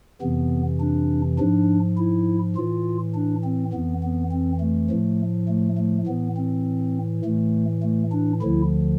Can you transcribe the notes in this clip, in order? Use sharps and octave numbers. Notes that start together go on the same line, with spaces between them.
F2 C3 E3 B3
D4
G#2 F3 D4
E4
A2 E3 F4
D4
C4
F2 E3 B3
B3
C4
A3
A2 F3
A3
A3
A2 E3 B3
C4
A2 E3 A3
A3
D4
D2 D3 F3 E4